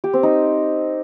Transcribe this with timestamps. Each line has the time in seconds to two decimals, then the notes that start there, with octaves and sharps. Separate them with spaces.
0.04 G4
0.13 C4
0.23 D#4